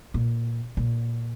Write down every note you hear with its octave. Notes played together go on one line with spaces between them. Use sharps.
A#2
A#2